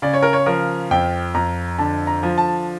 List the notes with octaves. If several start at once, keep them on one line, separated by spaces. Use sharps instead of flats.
C#3 D5
C#5
A#4
C#5
F3 A#4
F2 G5
F2 A#5
D3 A5
A#5
F3
A5